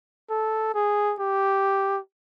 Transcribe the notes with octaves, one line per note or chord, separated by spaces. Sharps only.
A4
G#4
G4